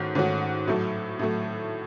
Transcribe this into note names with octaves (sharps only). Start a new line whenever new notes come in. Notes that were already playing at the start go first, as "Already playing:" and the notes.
Already playing: G#2 D#3 A3 C#4 F#4
G#2 D#3 A3 C#4 F#4
A2 F#3 A3
A2 F#3 A3